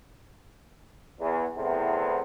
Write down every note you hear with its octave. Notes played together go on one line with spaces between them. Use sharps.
E2
E2 A2 C3 B3 C4